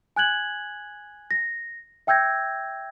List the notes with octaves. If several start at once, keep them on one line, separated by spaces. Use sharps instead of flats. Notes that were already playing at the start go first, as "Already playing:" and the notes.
G#5 F#6 G#6 F#7
A#6
E5 G5 E6 G6 G#6 A#6